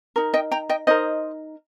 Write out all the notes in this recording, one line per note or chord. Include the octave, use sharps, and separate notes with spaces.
D#4 A#4
D#5 G5
G5 A#5
D#5 G5
D#4 A#4 C5 D#5